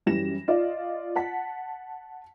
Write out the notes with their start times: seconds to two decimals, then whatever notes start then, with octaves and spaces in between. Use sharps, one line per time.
0.06 F#2 E3 G3 A#6 E7
0.48 F4 D5 D#5
1.16 F#5 A5 B6